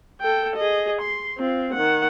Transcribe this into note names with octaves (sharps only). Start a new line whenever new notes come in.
A4 G5
G#4 D#5
C6
C4 F4
D#3 F#5